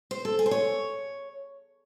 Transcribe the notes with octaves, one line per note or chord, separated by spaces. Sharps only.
C5
A4
G#4
C5
C#5